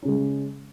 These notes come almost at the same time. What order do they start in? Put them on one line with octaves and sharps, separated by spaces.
C#4 C#3 G#3